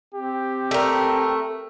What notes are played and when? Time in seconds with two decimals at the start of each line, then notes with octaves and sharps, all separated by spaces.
0.15 C4 G4
0.71 A3 A#4